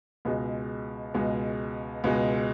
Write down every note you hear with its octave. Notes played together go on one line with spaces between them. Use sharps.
C#2 B2 G#3
C#2 B2 G#3
C#2 B2 G#3